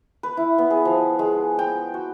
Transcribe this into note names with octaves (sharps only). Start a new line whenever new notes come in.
B4
E4
B3
G#4
F3
G#3
G5
F#4